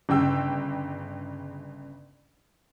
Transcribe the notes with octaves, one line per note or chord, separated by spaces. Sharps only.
G1 C#3 G5 E6